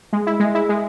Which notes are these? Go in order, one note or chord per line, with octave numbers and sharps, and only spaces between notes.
G#3
E4
G#3
E4
G#3